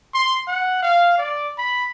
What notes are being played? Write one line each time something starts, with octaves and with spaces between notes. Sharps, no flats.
C6
F#5
F5
D5
B5